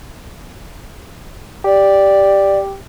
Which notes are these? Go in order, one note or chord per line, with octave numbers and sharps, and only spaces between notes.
G4 D5